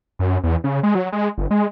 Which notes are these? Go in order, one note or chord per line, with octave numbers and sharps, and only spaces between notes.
F#2
E2
C#3
G#3
F#3
G#3
G1
G#3